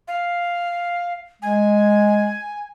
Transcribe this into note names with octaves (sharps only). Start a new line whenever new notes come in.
F5
G#3 G#5